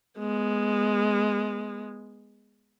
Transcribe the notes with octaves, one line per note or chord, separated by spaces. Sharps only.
G#3 B3